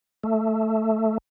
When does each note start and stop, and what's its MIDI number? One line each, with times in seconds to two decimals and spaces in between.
0.24 1.18 57